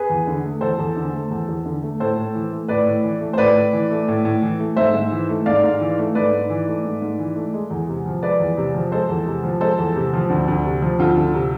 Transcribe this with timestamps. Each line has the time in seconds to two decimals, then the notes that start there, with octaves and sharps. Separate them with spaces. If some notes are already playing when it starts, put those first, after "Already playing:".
Already playing: G#4 B4
0.10 E2
0.27 D3
0.45 A3
0.61 E2 A4 C5
0.78 E2
0.96 D3
1.13 A3
1.30 E2
1.48 E2
1.65 D3
1.83 A3
2.00 A2 A4 C5
2.17 A2
2.35 E3
2.52 A3
2.68 A2 B4 D5
2.86 A2
3.03 E3
3.21 A3
3.33 C5
3.38 A2 B4 D5
3.55 A2
3.73 E3
3.91 A3
4.08 A2
4.25 A2
4.42 E3
4.60 A3
4.76 G#2 C5 E5
4.94 G#2
5.12 E3
5.29 A3
5.46 G#2 D5 F5
5.63 G#2
5.80 E3
5.98 A3
6.15 G#2 B4 D5
6.33 G#2
6.50 E3
6.67 A3
6.85 G#2
7.02 G#2
7.19 E3
7.35 A3
7.54 G#3
7.70 E2
7.88 C3
8.06 F3
8.22 G#3 B4 D5
8.39 E2
8.57 C3
8.74 F3
8.92 G#3 A4 C5
9.09 E2
9.27 C3
9.44 F3
9.61 G#3 A4 C5
9.78 E2
9.96 C3
10.13 F3
10.30 D2
10.48 D2
10.65 C3
10.82 F3
10.99 D2 F4 A4
11.17 D2
11.34 C3